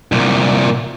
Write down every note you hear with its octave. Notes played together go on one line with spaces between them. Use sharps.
C2 A#2